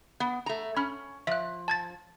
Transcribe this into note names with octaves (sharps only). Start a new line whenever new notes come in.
B3
A3 A#5
C#4 B5 F6
F3 E5 F#6
A5 G#6 A6